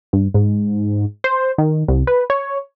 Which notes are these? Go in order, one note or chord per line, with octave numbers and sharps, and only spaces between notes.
G2
G#2
C5
D#3
C2
B4
C#5